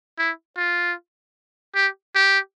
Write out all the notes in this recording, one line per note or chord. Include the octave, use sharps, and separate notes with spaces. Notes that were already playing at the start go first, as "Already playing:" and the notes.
E4
F4
G4
G4